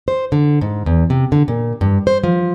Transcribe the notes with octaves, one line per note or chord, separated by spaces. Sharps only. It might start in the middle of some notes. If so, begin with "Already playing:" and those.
C5
D3
G#2
E2
C3
D3
A#2
G2
C5
F3